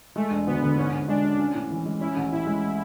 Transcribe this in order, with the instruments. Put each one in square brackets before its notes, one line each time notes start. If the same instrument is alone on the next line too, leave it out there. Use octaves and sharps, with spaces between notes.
[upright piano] G#3 [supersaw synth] A3
[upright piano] E1
[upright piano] D2 [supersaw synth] B3
[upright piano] D3
[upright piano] G#2 [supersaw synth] C#4
[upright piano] G#2
[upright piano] G#3 [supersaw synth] D4
[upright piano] C#4
C#4
A2
E3
G#3
[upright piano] C#4 [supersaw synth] E4
[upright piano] A1
[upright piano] A2 [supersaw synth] E4
[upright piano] G#3